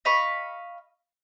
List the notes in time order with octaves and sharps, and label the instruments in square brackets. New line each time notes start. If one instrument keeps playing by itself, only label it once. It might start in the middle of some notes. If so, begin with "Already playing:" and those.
[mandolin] D#5 F5 B5 C#6